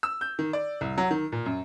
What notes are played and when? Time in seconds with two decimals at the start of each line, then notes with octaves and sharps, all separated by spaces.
0.03 E6
0.21 G6
0.39 D#3
0.53 D5
0.81 C2
0.98 F#3
1.11 D#3
1.32 A#2
1.46 F#2